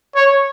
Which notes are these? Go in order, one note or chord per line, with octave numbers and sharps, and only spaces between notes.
C#5